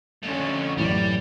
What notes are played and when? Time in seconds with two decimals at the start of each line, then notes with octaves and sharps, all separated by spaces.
0.23 F2 D3 A3 C#4 F#4
0.77 F#2 A2 E3 G3 D5